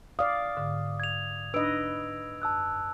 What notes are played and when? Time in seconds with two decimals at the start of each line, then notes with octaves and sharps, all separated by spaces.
0.19 D5 F5 D#6
0.57 G#2 D3
1.00 G#6 F7
1.54 D4 D#4 B4 D#5 E6 D7
2.42 F#2 A5 E6 F#6